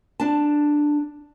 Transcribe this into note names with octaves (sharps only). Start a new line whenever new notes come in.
D4 A5